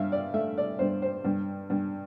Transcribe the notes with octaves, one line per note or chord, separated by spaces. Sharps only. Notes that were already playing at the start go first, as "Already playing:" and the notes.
Already playing: G2 E5 F5
D5
A3 E5
D5
G2 C5
C5
G2
G2